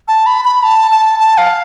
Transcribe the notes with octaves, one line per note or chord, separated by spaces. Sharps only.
A5
B5
B5
A5
A5
A5
F5